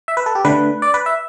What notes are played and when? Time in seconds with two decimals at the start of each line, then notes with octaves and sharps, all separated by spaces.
0.08 E5
0.17 B4
0.26 A4
0.35 G4
0.45 D3 A3 B4
0.82 D5
0.94 B4
1.06 E5